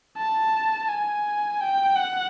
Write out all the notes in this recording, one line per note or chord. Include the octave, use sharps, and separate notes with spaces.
A5
G#5
G5
F#5